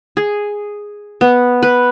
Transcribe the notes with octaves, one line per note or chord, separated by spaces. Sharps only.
G#4
B3
B4